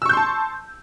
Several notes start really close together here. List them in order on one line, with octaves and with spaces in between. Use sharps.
E6 C#6 G6 C6 A5